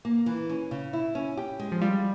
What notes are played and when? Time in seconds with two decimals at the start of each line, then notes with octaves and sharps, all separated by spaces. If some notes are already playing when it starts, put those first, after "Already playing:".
0.05 A#3
0.26 E3
0.49 C#4
0.71 C#3
0.93 E4
1.15 C#4
1.37 G4
1.59 G#3
1.72 F3
1.81 G3 F4